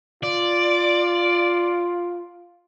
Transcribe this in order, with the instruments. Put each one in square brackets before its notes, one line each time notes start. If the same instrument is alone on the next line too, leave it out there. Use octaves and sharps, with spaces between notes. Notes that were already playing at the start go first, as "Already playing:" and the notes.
[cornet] F4 [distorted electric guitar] D5